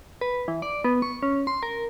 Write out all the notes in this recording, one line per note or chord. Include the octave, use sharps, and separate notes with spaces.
B4
E3
D5
B3
C#6
C#4
C6
A#4